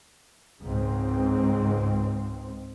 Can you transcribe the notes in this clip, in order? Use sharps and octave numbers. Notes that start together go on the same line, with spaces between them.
C#2 G#2 C4